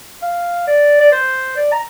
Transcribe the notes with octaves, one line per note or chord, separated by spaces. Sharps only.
F5
D5
D5
C5
D5
A#5